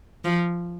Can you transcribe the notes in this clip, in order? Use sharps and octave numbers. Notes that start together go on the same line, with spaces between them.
F3